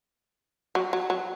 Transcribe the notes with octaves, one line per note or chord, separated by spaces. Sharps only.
F#3
F#3
F#3